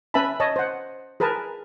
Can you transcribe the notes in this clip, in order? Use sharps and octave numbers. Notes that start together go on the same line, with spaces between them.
C#4 B4 E5 G#5 A5 B5
C#5 D#5 A5
C5 F#5
G#4 A#4 B4 G#5 A5